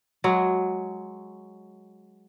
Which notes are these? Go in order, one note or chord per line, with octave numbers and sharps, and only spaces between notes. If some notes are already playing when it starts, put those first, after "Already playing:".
F#3 G#3